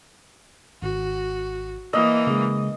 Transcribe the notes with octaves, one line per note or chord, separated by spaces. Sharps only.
G#1 F#4
E3 A#3 D#5 E6
C#3 G#3